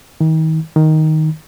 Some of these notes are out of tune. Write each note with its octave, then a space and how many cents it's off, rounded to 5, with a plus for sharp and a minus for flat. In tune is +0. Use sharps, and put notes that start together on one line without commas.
D#3 +35
D#3 +5